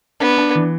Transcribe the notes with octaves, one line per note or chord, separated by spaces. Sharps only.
B3 D4
D4
E3